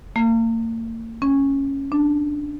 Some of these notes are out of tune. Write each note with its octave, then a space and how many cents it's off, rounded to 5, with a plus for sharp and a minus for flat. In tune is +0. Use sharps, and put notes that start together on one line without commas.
A#3 -40
C#4 -10
D4 +5